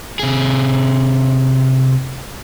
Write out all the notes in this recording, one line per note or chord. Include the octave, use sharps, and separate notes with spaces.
C3 G#4